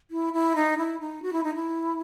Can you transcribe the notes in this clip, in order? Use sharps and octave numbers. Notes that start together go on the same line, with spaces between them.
E4
E4
D#4
E4
D#4
F#4
E4
D#4
E4